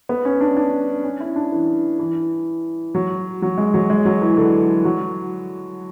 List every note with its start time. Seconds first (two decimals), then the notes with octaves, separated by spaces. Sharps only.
0.09 B3
0.25 C#4
0.41 D4
0.57 D4
1.04 C#4
1.20 E4
1.36 D4
1.52 E3
1.99 E3
2.95 F#3
3.42 F#3
3.58 G#3
3.74 F#3
3.90 G#3
4.05 F#3
4.22 E3
4.37 D3
4.85 F#3